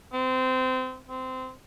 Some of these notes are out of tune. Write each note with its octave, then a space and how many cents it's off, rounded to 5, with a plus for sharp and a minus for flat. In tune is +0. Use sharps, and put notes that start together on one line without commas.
C4 -25
C4 -20